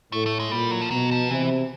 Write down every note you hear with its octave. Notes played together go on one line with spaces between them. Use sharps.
A2 A3
A3
G#3
A#2 G3
F#3
F3
B2 F#3
F3
C3 E3